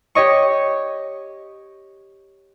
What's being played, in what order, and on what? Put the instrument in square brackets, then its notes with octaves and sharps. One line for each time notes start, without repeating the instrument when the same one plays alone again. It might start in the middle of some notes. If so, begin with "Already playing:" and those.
[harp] G4 C#5 D#5 C#6